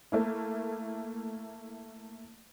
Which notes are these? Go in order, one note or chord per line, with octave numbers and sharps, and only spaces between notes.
A3 A#3 E4